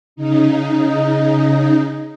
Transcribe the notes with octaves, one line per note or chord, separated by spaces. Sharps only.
C#3 D#4